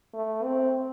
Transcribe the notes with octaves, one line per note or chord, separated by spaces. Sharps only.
A3
C4